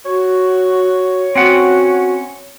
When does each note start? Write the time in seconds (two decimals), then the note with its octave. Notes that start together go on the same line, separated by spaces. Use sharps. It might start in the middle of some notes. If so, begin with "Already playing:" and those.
0.05 F#4 C#5
1.35 C4 C#4 F#4 F#5